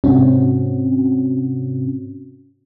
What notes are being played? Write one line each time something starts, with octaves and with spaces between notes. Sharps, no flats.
G#2 C3 C4 C#4 F#4